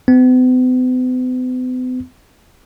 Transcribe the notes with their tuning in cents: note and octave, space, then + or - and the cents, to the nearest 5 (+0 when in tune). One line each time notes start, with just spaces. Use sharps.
B3 +45